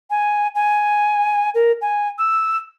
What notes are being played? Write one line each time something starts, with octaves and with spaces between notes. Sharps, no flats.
G#5
G#5
A#4
G#5
E6